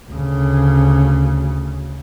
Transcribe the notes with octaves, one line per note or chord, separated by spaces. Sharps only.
D2 C#3